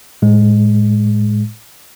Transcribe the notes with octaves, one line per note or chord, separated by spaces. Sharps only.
A2 G#3